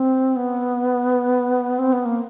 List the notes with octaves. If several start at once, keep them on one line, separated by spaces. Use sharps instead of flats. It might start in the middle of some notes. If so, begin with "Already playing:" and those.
Already playing: C4
B3
C4
B3
A#3